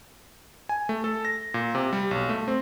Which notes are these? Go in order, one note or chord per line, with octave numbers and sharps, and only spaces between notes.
G#5
A3
A4
A#6
A#2
C3
G3
B1
A3
C4